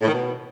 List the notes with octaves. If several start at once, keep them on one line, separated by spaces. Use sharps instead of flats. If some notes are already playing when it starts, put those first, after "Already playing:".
A2
D#3
B2